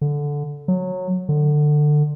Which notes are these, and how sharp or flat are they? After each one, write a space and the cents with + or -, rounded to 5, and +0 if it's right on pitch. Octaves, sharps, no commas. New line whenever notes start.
D3 -10
F#3 -15
D3 +20